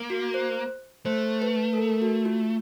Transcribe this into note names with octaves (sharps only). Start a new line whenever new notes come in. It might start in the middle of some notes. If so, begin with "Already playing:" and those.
Already playing: A#3
F#4
C5
A3 C5
B4
A4
A#4
F#4
F4